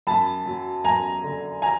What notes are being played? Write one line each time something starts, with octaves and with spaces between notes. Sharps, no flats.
F#2 A5 B5
F#3
F#2 G#5 A#5
D3
G#5 A#5